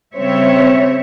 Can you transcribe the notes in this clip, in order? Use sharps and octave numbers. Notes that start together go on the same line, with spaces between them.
C#3 G3 C4 C#5 E5